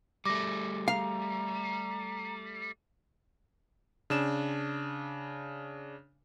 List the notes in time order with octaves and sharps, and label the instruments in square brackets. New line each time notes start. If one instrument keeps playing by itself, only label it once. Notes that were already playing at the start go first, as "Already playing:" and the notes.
[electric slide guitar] G3 A3 [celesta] D6 A#6
[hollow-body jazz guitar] F5 [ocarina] A#5
[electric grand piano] C#3 D4 E7